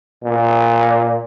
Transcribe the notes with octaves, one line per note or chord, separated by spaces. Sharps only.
A#2